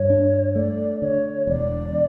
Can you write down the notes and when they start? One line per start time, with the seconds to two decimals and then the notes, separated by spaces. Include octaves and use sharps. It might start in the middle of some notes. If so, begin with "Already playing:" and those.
Already playing: G2 C#5
0.10 D4
0.55 A3 D5
1.02 D3 C#5
1.47 E1 D5